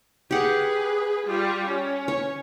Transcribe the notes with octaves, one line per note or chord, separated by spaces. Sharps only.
G4 G#4 B4 F#5
G3 F4
C#4
C#5